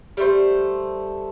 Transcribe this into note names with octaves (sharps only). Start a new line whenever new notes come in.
G3 A3 C5